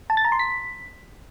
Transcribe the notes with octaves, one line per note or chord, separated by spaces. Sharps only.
A5
A6
A#5
C6
B6